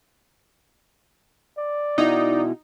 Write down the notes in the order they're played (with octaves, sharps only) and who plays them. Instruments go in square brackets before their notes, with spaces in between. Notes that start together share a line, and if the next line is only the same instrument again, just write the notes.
[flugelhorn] D5
[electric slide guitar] B2 E4 F#4 [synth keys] D#4